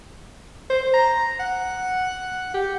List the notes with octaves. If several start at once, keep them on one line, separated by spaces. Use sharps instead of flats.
C5
A#5
F#5
G4